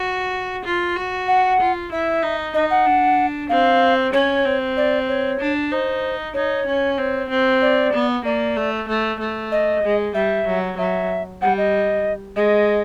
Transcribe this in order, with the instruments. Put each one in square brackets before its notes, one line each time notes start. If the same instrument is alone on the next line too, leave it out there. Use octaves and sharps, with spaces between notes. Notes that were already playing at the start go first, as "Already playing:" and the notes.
Already playing: [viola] F#4
F4
F#4
[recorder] F#5
[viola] F4
[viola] E4 [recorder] E5
[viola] D#4
[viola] D#4 [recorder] D#5
[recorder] F#5
[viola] D4
[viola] C4 [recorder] F5
[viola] C#4 [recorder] C#5
[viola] C4
[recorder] D5
C#5
[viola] D4
[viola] D#4 [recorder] C5
[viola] D#4 [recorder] C#5
[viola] C#4
C4
C4
[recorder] D5
[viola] B3
[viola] A#3 [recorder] D5
[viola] A3
A3
A3
[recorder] D#5
[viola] G#3
[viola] G3 [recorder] E5
[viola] F#3
[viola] F#3 [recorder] E5
[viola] G3 [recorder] F#5
[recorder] D#5
[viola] G#3 [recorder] D#5